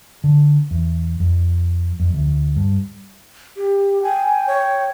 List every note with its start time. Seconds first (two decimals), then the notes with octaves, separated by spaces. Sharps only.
0.24 D3
0.71 E2
1.20 F2
2.00 F2
2.13 D2
2.56 G2
3.56 G4
4.03 G5 G#5
4.47 C#5